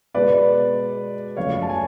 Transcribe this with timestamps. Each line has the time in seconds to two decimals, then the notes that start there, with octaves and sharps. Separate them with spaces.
0.14 B2 G#3 B4 D5
1.37 F#2 F3 A3 C#5 F5
1.62 A5
1.69 G#5